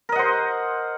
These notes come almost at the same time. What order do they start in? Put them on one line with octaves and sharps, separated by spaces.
A#4 D#5 F#5 C5